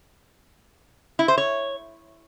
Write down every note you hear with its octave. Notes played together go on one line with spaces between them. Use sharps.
E4
C5
C#5